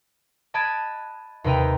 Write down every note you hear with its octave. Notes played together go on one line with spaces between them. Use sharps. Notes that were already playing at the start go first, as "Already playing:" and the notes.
D#5 A5 B5 F#6 G#6 D7
D#2 C3 D#4 B4 G5 A#5